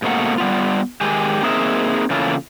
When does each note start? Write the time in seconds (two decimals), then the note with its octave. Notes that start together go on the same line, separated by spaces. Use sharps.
0.02 G#2 B2 A3 A#3 F#5
0.38 G3 B3 F4
1.01 D#3 G#3 G4 G#5
1.43 A#3 C4 D#4 G#4 A#4 E5
2.10 C#3 E3 A#3 C#4 F4 A4